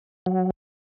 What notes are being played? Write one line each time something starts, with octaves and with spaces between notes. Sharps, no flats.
F#3